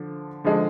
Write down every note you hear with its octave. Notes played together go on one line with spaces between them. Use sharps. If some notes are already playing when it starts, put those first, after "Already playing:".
Already playing: D3 F3
D3 F3 G#3